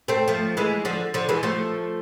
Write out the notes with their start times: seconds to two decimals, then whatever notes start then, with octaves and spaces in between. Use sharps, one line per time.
0.08 A3 C4
0.28 F3 A3
0.57 E3 G#3
0.85 D3 F3
1.14 D3 F3
1.29 E3 G#3
1.43 F3 A3